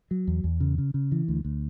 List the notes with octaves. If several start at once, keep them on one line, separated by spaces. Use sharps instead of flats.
F#3
E2
E2
C#3
C#3
C#3
E3
D2
D2